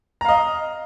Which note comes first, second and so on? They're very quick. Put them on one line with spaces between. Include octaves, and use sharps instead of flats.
A#5 F5 D#5